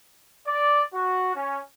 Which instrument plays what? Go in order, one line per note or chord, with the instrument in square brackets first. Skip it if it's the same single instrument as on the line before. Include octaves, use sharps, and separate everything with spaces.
[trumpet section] D5
F#4
C#4